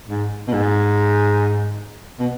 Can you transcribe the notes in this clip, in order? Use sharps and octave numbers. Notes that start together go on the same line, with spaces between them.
G#2
B2
G#2
B2